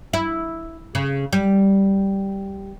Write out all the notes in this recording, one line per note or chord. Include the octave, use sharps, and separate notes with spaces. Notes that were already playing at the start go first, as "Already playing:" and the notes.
E4
C#3
G3